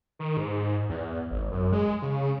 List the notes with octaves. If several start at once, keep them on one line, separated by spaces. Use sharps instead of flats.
D#3
G#2
E2
G#1
F#2
G#3
C#3